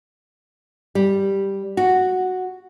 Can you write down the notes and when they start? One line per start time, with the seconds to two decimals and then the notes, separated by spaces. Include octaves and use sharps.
0.95 G3
1.77 F#4